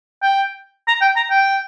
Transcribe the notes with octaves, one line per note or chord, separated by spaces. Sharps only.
G5
A#5
G5
A#5
G5